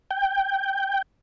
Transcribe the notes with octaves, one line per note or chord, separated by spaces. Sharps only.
G5